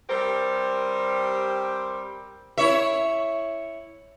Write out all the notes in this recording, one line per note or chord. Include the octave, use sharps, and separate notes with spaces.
G3 C4 G4 A#4 C5
E4 C#5 E5